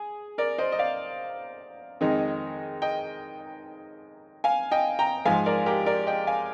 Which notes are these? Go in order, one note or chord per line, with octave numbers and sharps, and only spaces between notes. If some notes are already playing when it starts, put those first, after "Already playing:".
Already playing: G#4
A#4 D5
C5 D#5
D#5
D5 F5
F2 D#3 G#3 D#4
D#5 G5
F5 G#5
D#5 G5
G5 A#5
G#2 F3 G#3 F5 G#5
A#4 D5
G4 A#4
A#4 D5
D#5 G5
F5 G#5